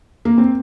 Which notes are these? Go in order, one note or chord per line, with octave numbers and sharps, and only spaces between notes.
A#3
C4